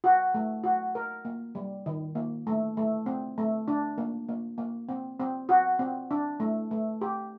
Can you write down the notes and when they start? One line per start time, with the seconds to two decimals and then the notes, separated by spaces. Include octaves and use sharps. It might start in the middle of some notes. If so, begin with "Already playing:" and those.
0.04 F#4
0.34 A3
0.64 F#4
0.95 A#4
1.25 A#3
1.55 G3
1.86 D#3
2.15 A#3
2.47 A3
2.77 A3
3.06 C4
3.38 A3
3.68 D4
3.98 A#3
4.29 A#3
4.58 A#3
4.89 C4
5.20 C4
5.49 F#4
5.79 C4
6.11 D4
6.40 A3
6.71 A3
7.01 G4